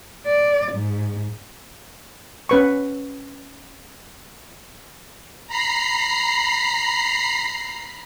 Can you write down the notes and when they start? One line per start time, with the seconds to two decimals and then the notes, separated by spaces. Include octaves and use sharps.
0.25 D5
0.72 G#2
2.49 C#4 B4 C#6
5.47 A#5 B5 C7